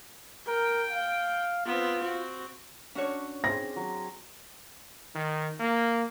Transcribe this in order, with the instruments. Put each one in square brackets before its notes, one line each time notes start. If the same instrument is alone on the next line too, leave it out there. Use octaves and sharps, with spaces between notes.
[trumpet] A#4 [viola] G5
[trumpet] F5
[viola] B3 C4 [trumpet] F4
[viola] C4 F#4
[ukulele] C#4 F#4 C#5 [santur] D4
[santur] C4 G#4 [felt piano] A#6
[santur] F#3 A#5
[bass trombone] D#3
A#3